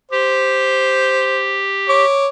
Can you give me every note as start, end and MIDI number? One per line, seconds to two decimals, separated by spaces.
0.12 2.05 67
0.12 1.66 72
1.89 2.27 73
1.89 2.27 86